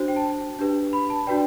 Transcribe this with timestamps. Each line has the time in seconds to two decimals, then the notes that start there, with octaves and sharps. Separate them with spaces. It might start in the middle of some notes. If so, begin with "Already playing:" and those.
Already playing: D4 F#4 C5
0.08 G5
0.16 A5
0.59 D4 G4 B4
0.93 B5
1.10 A5
1.27 D4 F#4 B4 D5 G5